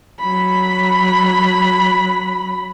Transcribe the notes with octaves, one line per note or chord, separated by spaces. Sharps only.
F#3 B5